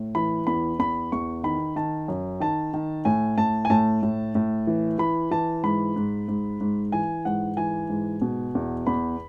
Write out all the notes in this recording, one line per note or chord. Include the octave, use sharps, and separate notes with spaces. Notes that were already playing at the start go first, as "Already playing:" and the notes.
Already playing: A2
E3 B5
E2 B5
E2 B5
E2 C#6
D#3 B5
D#3 A5
F#2
D#3 A5
D#3
A2 G#5
A2 A5
G#5
A2 A5
A2
A2
E3
E3 B5
E3 A5
G#2 B5
G#2
G#2
G#2
E3 G#5
G#2 F#5
E3 G#5
G#2
B2
E2
E2 B5